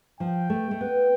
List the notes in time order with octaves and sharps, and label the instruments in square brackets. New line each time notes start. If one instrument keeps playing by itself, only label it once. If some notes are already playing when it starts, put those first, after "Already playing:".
[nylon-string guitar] F3 [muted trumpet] G5
[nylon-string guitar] A3
A3
B3